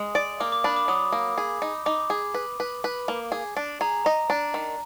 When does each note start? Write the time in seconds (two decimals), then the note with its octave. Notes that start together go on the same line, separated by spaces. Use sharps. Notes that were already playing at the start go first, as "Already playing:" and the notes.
Already playing: G#3 D#6
0.15 D5
0.40 A#3 D6
0.52 D6
0.64 D4 B5
0.76 D6
0.88 F#3 D#6
1.12 A#3
1.38 G#4
1.62 D#4
1.86 D#4 D6
2.10 G#4
2.34 B4
2.60 B4
2.84 B4
3.08 A#3
3.32 G#4
3.57 D4
3.81 G#4 A#5
4.05 D#5 A#5
4.30 D4
4.54 D#3